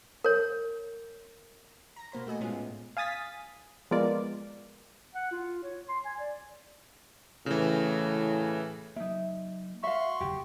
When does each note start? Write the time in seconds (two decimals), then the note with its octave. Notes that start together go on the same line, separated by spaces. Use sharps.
0.24 A#4 C#5
1.96 A#5 A#6
2.12 B2 A#3 C5 B5
2.27 A3 F#4 D#5 G#5
2.40 A#2 G#3 B3 C#4 F4 G#4
2.52 A2
2.97 F5 G#5 D#6 A6 B6
3.91 F3 G#3 B3 F4 A#4 D5
5.15 F#5
5.32 F4
5.63 C#5
5.89 C6
6.05 G#5
6.20 D5
7.46 A2 C#3 E3
8.96 F#3 A#3 D#4 E5
9.83 F#4 E5 F5 C6 C#6
10.20 F#1 E2 G4